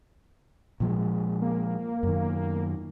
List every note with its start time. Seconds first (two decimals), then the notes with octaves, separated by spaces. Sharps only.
0.80 A#2 F3 G#3
1.42 A#3
2.03 F#2 D#3